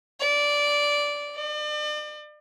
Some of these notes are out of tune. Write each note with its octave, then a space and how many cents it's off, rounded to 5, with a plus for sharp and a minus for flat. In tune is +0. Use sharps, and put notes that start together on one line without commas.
D5 -10
D5 +40